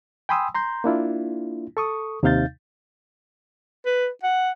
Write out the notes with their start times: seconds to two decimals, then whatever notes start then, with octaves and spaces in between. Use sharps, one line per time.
0.29 G5 G#5 B5 C6 D#6 E6
0.55 A#5 C6 G6
0.84 A#3 D4 E4 F4
1.77 A4 C#6 D#6
2.23 D#2 C3 D#4 F5 G6 A6
3.85 B4
4.23 F#5